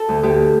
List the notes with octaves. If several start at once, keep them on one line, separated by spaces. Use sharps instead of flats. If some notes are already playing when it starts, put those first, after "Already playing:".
Already playing: A4
D2
D2 G4